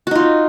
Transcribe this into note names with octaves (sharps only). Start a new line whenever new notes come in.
D#4 F4 F#4